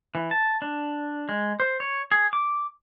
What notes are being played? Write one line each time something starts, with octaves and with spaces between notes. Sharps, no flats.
E3
A5
D4
G#3
C5
C#5
G#4
D6